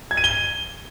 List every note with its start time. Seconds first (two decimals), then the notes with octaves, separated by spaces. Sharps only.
0.11 G#6
0.17 D#7
0.24 G7